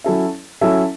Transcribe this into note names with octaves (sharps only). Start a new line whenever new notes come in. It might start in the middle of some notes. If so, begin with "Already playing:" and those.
F#3 C#4 E4 A4 E5
F#3 C#4 E4 A4 E5